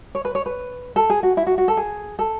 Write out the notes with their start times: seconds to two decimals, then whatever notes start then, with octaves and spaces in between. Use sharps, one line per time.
0.15 C#5
0.25 B4
0.35 C#5
0.46 B4
0.96 A4
1.10 G#4
1.23 F#4
1.37 E4
1.47 F#4
1.58 F#4
1.68 A4
1.77 G#4
2.19 A4